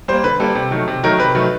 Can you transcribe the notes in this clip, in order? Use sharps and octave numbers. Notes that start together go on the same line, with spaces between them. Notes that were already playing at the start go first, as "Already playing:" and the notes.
G3 A#3 C5
D3 B4
G3 A#3 A4
C3
D#3 F#3 A3
C3
D#3 F#3 A3 A#4
C3 B4
D#3 F#3 A3